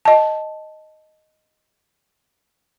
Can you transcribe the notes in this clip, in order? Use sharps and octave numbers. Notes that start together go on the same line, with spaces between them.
D#5 A5